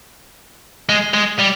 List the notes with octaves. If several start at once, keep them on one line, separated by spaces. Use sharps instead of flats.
G#3
G#3
G3